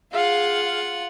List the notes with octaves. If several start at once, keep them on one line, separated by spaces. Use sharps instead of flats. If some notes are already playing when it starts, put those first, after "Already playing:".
F4 G#4 F5 F#5